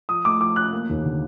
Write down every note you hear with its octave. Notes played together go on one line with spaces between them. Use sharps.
F3 D#6
A3 D6
F3 D6
C#4 F#6
A#3
D#2
D3